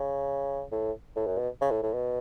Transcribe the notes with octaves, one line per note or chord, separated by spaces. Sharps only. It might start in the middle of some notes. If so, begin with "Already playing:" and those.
Already playing: C#3
A2
A2
F#2
B2
C#3
A2
A2
B2